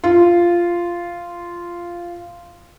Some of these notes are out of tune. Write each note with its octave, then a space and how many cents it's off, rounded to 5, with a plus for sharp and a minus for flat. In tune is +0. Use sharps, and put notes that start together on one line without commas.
F4 -10